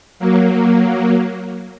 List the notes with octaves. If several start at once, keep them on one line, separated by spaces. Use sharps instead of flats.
F#3 A#3